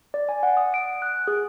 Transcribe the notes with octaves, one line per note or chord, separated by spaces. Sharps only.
D5
G#5
F#5
D#6
D7
F#6
G#4